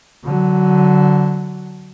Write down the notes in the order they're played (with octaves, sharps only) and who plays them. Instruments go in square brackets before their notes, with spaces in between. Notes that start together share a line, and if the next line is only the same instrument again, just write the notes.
[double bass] D3 F#3